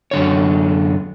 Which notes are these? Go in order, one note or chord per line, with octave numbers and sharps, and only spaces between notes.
F#2 D3 C#5